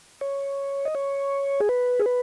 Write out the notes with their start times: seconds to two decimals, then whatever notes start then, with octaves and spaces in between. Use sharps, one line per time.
0.21 C#5
0.85 D#5
0.95 C#5
1.60 G#4
1.69 B4
1.99 G#4
2.06 B4